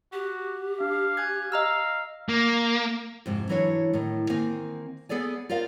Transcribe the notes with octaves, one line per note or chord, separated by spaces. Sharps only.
F#4 G4
D4 F5
G#5 F#6 G#6
D#5 F5 A#5 E6
A#3
F2 G#2 C3
E3 F#3 D4 E4 C#5
A2 D#3
D#3 A#3 C4 G#5
B3 G#4 A4 D5 G#5
F4 A#4 C5 D5 F5